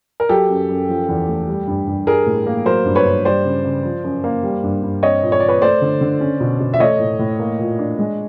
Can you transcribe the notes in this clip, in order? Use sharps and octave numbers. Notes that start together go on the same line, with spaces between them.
A#4
F#3 G4 A4
F#2
F#2
F3
E2
A3
G3
G2
G2
G3 G#4 A#4
A2
A#3
F#3 A#4 C5
G2
B4 C#5
G2
G3 C5 D5
C#3
C#3
F3
F#2
A#3
G3
G2
G2
C4 C#5 D#5
A#2
C#5
A#2 D5
B4 C#5
A3 C5 D5
D3
D3
C#4
B2
B2
E5
A3 C#5 D#5
A2
A2
A#3
A#2
D4
G#3